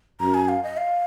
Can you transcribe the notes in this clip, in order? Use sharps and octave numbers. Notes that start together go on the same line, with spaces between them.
F#2 A#5
G#5
F5
D#5
F5